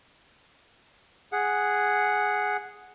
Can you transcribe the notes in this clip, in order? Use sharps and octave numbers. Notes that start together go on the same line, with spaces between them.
G#4 F#5